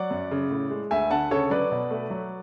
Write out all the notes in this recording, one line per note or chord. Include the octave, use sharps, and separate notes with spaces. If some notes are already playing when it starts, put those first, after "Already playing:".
Already playing: F#3 D5 F#5
F#2
C#3
A2
G#3
D2 E5 G#5
D3 F#5 A5
C#3 A4 C#5
F#3 B4 D5
B2
A3
F#3